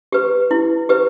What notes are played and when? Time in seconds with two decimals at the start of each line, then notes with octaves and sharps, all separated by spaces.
0.12 G4 B4
0.51 E4
0.89 G4 B4